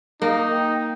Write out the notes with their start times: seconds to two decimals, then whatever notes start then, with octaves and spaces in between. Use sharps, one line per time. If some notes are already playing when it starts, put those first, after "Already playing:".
0.22 A#3 D#4
0.52 G5